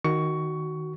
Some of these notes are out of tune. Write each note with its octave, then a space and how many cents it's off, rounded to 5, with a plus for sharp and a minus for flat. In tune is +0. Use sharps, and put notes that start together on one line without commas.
D#3 +0 F#4 +10 C#6 +15